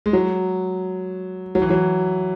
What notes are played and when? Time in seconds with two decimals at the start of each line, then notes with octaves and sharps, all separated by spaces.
0.06 G#3
0.13 F#3
1.55 F#3
1.62 E3
1.70 F#3